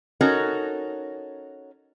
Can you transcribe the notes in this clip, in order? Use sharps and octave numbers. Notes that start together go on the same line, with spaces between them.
C#4 D#4 F#4 A4 A#4 C#5